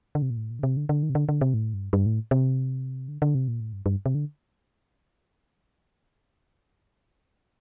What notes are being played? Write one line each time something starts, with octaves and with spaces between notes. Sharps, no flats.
D3
C3
A#2
A2
A#2
D3
C3
D3
D3
D#3
C3
D3
D3
C3
A2
G2
G2
A2
C3
D3
D3
C3
A#2
A2
G2
G2
C3
D3